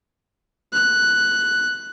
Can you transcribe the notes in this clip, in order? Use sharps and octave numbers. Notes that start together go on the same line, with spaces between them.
F#6